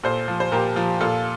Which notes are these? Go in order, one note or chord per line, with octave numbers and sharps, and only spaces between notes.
A#2 A4 C5
F3
C5
A#2 G4 A#4
F3
A#2 F4 A4